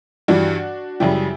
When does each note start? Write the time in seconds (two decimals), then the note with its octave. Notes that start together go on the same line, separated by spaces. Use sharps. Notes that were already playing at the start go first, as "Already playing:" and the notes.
0.28 G2 E3 G3 D4 F#4
1.00 F#2 C#3 G3 E4 G4